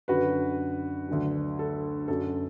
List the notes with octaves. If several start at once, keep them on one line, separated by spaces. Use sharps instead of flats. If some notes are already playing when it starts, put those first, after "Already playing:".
F#2 D3 F#3 F#4 B4
D2 D3 F#3
A4
F#2 F#3 A4